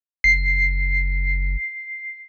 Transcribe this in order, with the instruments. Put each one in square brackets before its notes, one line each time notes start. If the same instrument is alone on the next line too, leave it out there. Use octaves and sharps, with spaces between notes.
[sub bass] F#1 [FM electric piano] C7